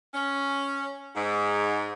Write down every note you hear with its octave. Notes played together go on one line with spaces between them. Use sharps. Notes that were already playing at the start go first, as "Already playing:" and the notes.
C#4
G#2